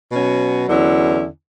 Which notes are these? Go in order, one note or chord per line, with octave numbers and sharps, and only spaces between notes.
B2 F#3 C#4
E2 D3 F#3 C#4 E4